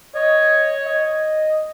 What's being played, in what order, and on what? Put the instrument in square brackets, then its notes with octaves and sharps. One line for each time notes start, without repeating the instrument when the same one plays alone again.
[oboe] C#5 [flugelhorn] D#5
[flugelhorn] D#5